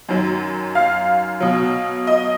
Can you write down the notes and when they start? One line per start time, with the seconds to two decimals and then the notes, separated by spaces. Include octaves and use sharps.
0.09 F#2 D#3 F#3
0.75 F5
1.40 B2 F#3
2.07 D#5